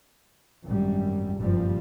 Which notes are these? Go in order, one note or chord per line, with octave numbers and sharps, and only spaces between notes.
G#1 F#2 G3
F#1 G2 A#2 F3 G3